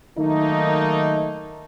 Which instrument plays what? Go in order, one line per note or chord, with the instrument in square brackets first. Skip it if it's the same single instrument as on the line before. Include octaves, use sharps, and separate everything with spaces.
[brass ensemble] D#3 F#3 A3 A#3 D#4